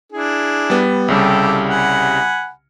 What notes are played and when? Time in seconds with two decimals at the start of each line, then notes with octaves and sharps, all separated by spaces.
0.12 D4 E4 G#4
0.70 G3 B3
1.08 C2 C#3 G3 G4 A4 E6
1.69 F#5 G#5 B5